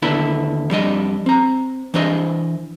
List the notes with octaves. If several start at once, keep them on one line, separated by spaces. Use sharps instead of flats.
D#2 D3 B3 E4 A5 B5
F2 G3 D4 D#5
C4 A#5
E3 D4 C5 D#5